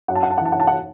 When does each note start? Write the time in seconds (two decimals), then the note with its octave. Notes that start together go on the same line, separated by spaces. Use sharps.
0.08 F#2 F#5
0.15 A5
0.23 F#5
0.30 A5
0.38 F#5
0.41 E3 A5
0.52 F#5
0.60 A5
0.67 F#5